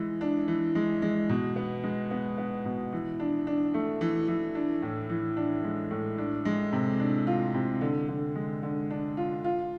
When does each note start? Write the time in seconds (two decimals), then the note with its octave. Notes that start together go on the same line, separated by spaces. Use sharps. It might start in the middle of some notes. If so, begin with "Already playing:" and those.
Already playing: E3 G#3
0.21 D4
0.48 E3
0.75 G#3
1.02 G#3
1.29 B2
1.56 B3
1.84 G#3
2.11 B3
2.38 B3
2.65 B2
2.92 E3
3.20 D4
3.47 D4
3.74 A3
4.01 E3
4.28 E3
4.55 D4
4.82 A2
5.10 E3
5.37 D4
5.64 G#3
5.91 A2
6.18 D4
6.45 G#3
6.73 C3
7.00 D4
7.27 F4
7.54 C3
7.81 D3
8.08 D3
8.35 G#3
8.63 D3
8.90 D4
9.17 F4
9.44 F4